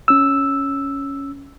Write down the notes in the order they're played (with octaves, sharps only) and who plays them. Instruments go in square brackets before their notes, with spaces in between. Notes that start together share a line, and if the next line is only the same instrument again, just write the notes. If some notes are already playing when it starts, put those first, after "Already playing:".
[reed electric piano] C#4 E6